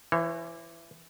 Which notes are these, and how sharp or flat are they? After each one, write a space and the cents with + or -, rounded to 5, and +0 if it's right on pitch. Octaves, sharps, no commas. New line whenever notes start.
E3 +20 C#5 -30